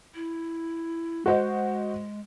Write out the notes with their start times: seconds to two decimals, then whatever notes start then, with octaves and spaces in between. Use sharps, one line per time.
0.15 E4
1.26 G#3 F#4 C5 D#5